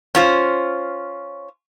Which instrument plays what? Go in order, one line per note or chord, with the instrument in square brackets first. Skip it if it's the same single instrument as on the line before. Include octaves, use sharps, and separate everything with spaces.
[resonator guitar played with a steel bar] C#4 F4 C5